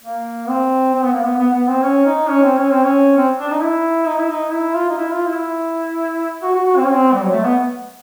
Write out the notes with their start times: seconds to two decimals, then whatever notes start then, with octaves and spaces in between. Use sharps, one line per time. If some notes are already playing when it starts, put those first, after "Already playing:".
0.04 A#3
0.49 C4
0.94 C4
1.03 B3
1.13 A#3
1.23 B3
1.39 B3
1.53 B3
1.69 C4
1.83 C#4
2.05 D#4
2.28 C#4
2.43 C4
2.58 C#4
2.71 C4
2.84 C#4
3.17 C4
3.39 D4
3.51 D#4
3.62 E4
4.07 D#4
4.20 E4
4.30 D#4
4.52 E4
4.75 F4
4.90 D#4
4.97 E4
5.12 F4
5.26 E4
6.42 F#4
6.54 F#4
6.65 F#4
6.77 C4
6.85 C#4
6.93 C4
7.13 G3
7.21 F#3
7.32 A3
7.43 B3